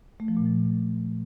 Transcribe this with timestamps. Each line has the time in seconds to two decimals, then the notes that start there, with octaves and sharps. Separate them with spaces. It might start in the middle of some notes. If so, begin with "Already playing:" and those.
0.20 A3
0.28 F3
0.37 A#2
0.45 F3